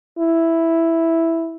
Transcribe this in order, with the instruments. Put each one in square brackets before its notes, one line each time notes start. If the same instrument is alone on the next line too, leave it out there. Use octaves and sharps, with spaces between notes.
[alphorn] E4